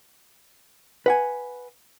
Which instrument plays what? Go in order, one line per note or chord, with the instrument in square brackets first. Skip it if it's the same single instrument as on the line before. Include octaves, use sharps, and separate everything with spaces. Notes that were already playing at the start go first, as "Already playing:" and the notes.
[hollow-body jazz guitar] B4 F#5 G#5